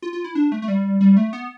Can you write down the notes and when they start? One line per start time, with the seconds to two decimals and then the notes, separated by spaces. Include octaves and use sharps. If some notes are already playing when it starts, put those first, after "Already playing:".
0.02 F4
0.13 F4
0.24 E4
0.35 D4
0.52 A3
0.62 A3
0.68 G3
1.01 G3
1.17 A3
1.33 B3